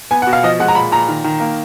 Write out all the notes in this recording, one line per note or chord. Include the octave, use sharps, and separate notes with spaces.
B3 G#5
F#5
B2
F5
F3 D#5
G#3 F#5
A#5
A#2 B5
A#2 A#5
D#3
D#3
A#3